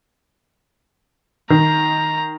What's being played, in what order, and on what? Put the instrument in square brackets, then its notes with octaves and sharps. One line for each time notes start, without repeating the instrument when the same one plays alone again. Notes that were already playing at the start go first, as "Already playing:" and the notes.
[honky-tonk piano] D#3 [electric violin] A#5